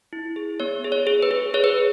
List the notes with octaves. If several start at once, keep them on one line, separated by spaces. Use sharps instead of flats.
E4
G#4
B3 C#5
G#4
C#5
G#4
B4
G#4
G#4 C#5
B4